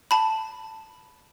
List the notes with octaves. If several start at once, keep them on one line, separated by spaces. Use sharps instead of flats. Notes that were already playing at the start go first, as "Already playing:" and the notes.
A5 B5